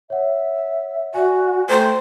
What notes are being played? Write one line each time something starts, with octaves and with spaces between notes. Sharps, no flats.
C#5 E5 F#5
F#4 D5 G#5
A3 A4 C5 G5 A#5